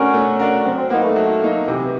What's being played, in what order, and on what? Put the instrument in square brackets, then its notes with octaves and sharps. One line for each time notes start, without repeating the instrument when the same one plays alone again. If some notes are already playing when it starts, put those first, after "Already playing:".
Already playing: [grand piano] A3 D4 F#4 A#4 [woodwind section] C#4
[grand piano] A3
D4 F#4 A#4
[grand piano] F#3 [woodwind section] C4
[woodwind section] C4
[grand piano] A#3 D#4 [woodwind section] B3
[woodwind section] A3
[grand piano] F#3
A#3 D#4
[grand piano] C3 [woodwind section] E3